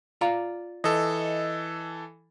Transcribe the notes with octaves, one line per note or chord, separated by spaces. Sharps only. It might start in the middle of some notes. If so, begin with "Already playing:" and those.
F4 D5 A#5
E3 A4 D#5